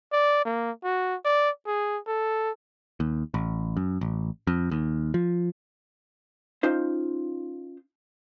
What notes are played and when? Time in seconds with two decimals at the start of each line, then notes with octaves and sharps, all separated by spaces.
0.13 D5
0.45 A#3
0.84 F#4
1.25 D5
1.66 G#4
2.07 A4
3.00 D#2
3.34 A1
3.77 F#2
4.01 A1
4.47 F2
4.71 D#2
5.14 F3
6.63 C#4 D#4 F4 C5